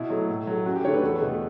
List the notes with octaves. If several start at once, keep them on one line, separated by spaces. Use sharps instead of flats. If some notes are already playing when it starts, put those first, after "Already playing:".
Already playing: B2 E4
F#3 A3
A2
F#3 A3
F#2 F#4
G4
D3 A3 C#5
B4
E2 A4
B2 A3